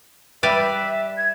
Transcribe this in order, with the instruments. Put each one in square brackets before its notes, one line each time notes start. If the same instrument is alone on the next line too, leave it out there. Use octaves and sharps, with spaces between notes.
[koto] G3 B4 D5 [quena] E5
[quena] G#6